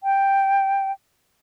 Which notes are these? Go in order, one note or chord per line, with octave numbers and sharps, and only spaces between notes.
G5